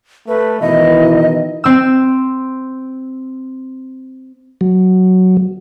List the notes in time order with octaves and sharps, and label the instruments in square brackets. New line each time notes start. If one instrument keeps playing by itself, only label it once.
[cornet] A3 [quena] B4
[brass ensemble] B2 D#3 E3 [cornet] E4 [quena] D#5
[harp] C4 E6
[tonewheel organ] F#3